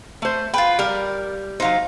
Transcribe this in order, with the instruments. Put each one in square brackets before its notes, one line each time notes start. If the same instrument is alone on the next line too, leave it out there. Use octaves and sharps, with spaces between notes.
[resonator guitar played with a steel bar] A3 C5
[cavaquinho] F4 B4 [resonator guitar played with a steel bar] G5
[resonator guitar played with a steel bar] G3 [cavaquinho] A#4
[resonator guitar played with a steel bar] F#3 C5 [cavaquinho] D#4 F5